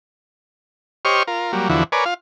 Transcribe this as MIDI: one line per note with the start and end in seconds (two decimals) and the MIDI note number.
1.05 1.23 67
1.05 1.23 72
1.05 1.23 73
1.05 1.23 75
1.05 1.23 85
1.05 1.23 89
1.27 1.52 65
1.27 1.52 70
1.53 1.68 54
1.53 1.68 55
1.53 1.68 58
1.69 1.84 40
1.69 1.84 50
1.69 1.84 53
1.69 1.84 64
1.69 1.84 66
1.92 2.05 70
1.92 2.05 71
1.92 2.05 73
1.92 2.05 74
1.92 2.05 80
2.05 2.14 65
2.05 2.14 77